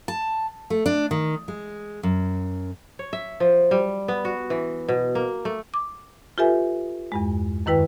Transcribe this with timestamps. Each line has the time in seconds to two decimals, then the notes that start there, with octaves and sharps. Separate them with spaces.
0.08 A5
0.70 A3
0.86 D4
1.11 D#3
1.48 G#3
2.03 F#2
2.99 C#5
3.13 E5
3.40 F3
3.71 G3
4.08 B3
4.25 F#4
4.50 E3
4.89 B2
5.15 A#3
5.45 A3
5.74 D6
6.38 F4 G4 A4 B4 E5 G#5
7.12 E2 G2 G#3
7.66 F#2 D#3 E4 B4 G5